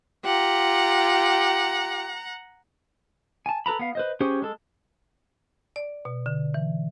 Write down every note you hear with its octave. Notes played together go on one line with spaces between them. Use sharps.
F4 G4 F#5 A#5
G#5 A5
A4 B4 A#5 B5
B3 F5
B4 C5 D#5
C#4 G4 G#4 C5 C#5
G#3 A4
D5
B2
D3
E3